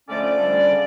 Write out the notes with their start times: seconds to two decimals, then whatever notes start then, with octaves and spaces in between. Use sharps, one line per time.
0.08 F2 D3 A3 C#4 D5
0.23 D5
0.38 F2 D3 G3 C#4
0.70 C#3